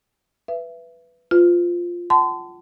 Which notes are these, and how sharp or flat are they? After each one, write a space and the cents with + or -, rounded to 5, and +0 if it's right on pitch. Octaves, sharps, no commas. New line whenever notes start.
B4 +0 E5 +30
F4 +0 B4 +40
F#5 +30 A5 +0 C6 -35